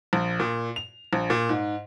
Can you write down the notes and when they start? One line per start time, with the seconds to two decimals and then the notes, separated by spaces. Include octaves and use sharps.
0.13 A#1
0.40 A#2
0.76 F7
1.13 A#1
1.30 A#2
1.49 G#2